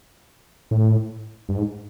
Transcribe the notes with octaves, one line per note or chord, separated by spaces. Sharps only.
A2
G2
G#2